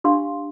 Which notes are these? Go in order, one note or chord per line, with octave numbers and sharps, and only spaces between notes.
D4 G4 F5 C6